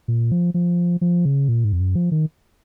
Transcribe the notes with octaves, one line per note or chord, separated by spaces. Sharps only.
A#2
F3
F3
F3
C#3
A#2
G#2
F2
F#2
F3
D#3